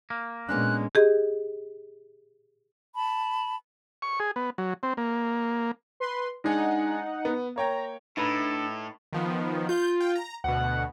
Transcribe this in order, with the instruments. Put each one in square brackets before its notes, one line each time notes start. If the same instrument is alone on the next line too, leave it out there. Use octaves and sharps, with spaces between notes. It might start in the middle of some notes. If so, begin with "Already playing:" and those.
[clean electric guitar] A#3
[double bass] A#2 G#3 [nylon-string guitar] B3 C#4 D4 [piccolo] F#6
[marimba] G4 G#4 D#5
[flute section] A5 B5
[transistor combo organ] C#6
G#4
B3
F#3
C4
A#3
[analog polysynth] B4 C6
[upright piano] G#3 D4 G#4 [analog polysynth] D#4 F#5
[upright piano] B3
[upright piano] A#3 C#5 G5 [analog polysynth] A#5
[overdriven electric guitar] A2 [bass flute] D4 [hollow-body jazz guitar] D#4 B4 [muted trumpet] A4
[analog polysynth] D#3 F3 B3
[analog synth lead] F4 [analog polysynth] G6
[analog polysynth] G5
A#5
[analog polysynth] D2 B2 [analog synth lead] F#5